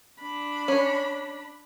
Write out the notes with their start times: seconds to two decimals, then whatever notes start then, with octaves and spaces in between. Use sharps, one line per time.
0.20 D4 B5
0.68 C#4